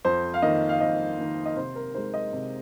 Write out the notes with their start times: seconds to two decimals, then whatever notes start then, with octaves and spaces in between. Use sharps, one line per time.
0.05 F2 C5
0.34 F5
0.42 D#3 A#3 D#5
0.69 F5
0.81 F2 D#5
1.18 D#3 A#3
1.46 D#5
1.56 C3 C5
1.76 A#4
1.94 G#3 D#4 C5
2.14 D#5
2.33 C3